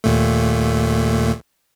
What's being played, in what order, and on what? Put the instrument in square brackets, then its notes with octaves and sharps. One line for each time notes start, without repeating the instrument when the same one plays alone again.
[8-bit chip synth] D#2 A#2 A3